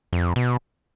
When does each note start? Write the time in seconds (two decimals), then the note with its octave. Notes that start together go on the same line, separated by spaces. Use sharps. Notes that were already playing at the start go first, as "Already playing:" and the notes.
0.13 F2
0.36 B2